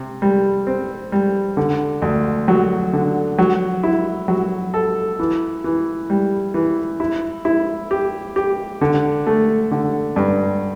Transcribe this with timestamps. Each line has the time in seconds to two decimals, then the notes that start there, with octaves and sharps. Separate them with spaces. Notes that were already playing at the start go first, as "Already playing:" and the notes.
Already playing: C3
0.22 G3
0.67 C4
1.12 G3
1.57 D3
2.02 D2
2.48 F#3
2.93 D3
3.38 F#3
3.84 E4
4.28 F#3
4.74 A4
5.19 E3
5.64 E3
6.10 G3
6.54 E3
7.00 E4
7.45 E4
7.91 G4
8.36 G4
8.81 D3
9.27 A3
9.71 D3
10.16 G2